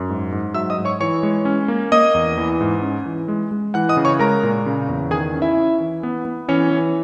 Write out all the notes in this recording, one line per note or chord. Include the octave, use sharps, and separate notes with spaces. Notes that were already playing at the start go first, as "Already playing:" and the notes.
Already playing: F#2
G#2
G#2
F#3 E5 E6
D#5 D#6
G#2
C#5 C#6
E3 C#5 C#6
G#3
C#4
A#3
A#3 D#5 D#6
E2
E3
G#2
C#4
E3
G#3
G#3
E3 F#5 F#6
D#5 D#6
C#3
C#5 C#6
G#3 A#4 A#5
A#2
C#3
E2
D#3 G#4 G#5
C#4
E4 E5
C#4
E3
B3
B3
E3 C#4 C#5
E3